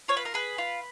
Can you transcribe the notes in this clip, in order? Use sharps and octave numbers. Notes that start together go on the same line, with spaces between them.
F4 C#5
B4
A#4
G#4 B4
F4